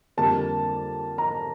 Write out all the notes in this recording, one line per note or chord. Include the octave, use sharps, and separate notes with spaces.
F2 D3 G3 A#3 A5
A#5